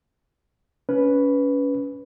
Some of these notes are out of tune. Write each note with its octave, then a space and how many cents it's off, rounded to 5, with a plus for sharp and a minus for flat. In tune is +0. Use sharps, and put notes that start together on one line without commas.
C#4 +25 B4 +0